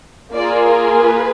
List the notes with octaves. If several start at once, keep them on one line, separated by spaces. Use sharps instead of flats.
A#3 F4 G#4 D5
A#4
B4